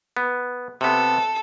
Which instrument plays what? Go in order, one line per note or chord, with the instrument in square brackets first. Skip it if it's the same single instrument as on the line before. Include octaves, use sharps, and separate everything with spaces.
[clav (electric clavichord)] B3
[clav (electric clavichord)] C3 B3 [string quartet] A4